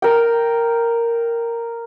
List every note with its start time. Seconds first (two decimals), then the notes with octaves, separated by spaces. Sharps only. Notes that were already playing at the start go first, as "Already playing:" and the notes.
0.02 A#4 G5